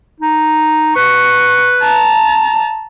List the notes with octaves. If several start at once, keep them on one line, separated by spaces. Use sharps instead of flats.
D#4
B4 C#6
A5 A#5